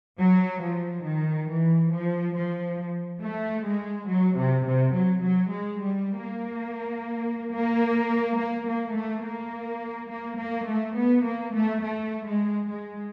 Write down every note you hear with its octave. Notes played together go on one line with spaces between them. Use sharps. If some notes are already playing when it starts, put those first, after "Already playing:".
F#3
F3
D#3
E3
F3
F3
A3
G#3
F#3
C3
C3
F#3
F#3
G#3
G3
A#3
A#3
A#3
A#3
A3
A#3
A#3
A#3
A3
B3
A#3
A3
A3
G#3
G#3